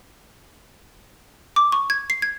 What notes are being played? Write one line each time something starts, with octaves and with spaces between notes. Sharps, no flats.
D6
C#6
G#6
C7
G#6